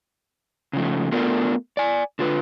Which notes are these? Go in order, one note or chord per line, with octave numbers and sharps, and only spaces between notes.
C#3 F3 A3
A3 B3 D4 F4 A#4
D5 G#5
D3 F4 B4